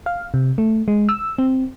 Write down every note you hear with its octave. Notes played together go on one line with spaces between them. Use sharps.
F5
C3
A3
G#3
E6
C4